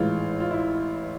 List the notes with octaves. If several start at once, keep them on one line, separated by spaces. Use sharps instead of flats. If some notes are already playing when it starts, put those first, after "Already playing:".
Already playing: A1 G#2 E3 G#3 F4
F4
E4